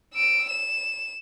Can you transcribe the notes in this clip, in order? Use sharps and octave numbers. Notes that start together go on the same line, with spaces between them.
E6 D7
E7